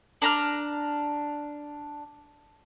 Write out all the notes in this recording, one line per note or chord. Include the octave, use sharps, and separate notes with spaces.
D4 A#5 F6